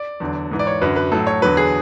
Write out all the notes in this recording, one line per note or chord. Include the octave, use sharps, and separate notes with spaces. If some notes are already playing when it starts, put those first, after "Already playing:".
Already playing: D5
E2 D3 F#3
G#2 E3
D5
C#5
F#2 D3 F#3 B4
B4
A2 F#3 A4
C#5
E2 D3 F#3 B4
G#4